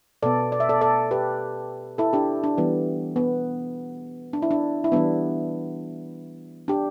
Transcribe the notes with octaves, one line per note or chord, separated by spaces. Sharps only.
B2 B3 A4 D5
D5
E5
A4 D5
A4 D5
G4 B4
E4 A4
D4 G4
D4
E3 G3 B3
B3
D4
E4
D4
E4
E3 G3 B3 D4
D4 G4